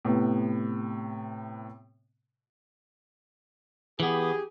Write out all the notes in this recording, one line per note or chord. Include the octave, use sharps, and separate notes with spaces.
A2 C3 B3
E3 B3 G4 G#4